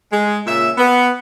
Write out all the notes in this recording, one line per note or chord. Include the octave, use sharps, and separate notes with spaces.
G#3
A#2 C#3 E5
B3